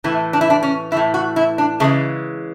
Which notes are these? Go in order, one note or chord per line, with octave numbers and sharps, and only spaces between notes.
A2 E3 A3 E4
D4
E4
D4
C#4
A2 E3 A3 E4
F#4
E4
D4
C#3 E3 G#3 A3